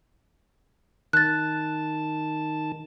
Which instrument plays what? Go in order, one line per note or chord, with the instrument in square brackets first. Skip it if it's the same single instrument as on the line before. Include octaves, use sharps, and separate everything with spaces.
[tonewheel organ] D#3 A5 [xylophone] F#6 A6